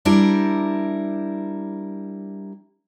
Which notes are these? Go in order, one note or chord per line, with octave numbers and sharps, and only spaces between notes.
G3 D4 E4 A#4